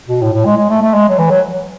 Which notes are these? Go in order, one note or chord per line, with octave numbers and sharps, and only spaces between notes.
B2
A2
A2
G#3
G#3
A3
A3
G#3
F#3
E3
F#3